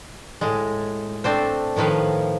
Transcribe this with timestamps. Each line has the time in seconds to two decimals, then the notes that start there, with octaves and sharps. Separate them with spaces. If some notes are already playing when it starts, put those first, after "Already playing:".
0.41 A2 G#3
1.24 A3 C4 D4 C5
1.76 A2 D#3 F3 B4 F5